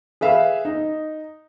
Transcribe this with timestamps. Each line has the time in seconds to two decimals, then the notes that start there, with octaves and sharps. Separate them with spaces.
0.21 G#4 B4 E5 F5
0.65 D#4